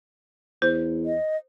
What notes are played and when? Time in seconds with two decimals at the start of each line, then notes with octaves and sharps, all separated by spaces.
0.62 E2 C5
1.06 D#5